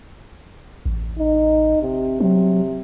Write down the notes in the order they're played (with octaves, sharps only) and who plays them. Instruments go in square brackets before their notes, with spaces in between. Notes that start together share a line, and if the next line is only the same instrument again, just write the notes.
[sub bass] A1
[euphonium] D#4
C3
[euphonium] C3 [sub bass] F#3